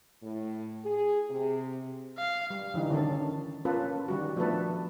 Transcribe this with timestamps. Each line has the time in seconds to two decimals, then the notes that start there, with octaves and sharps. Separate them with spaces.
0.23 A2
0.85 G#4
1.31 C3
2.18 F5
2.50 G3
2.74 D3 E3 G3 D#4
2.90 D3 D#3 C#4 A4
3.65 A#3 C#4 F4 A4 B4
4.08 D#3 G3 F#4
4.36 F3 A3 B3 D4 A4 B4